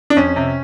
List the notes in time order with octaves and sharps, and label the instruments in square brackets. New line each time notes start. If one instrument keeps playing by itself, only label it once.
[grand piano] D4
F2 C#4
C3